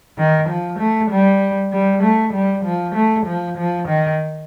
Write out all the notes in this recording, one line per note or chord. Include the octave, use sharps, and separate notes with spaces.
D#3
F3
A3
G3
G3
A3
G3
F3
A3
F3
F3
D#3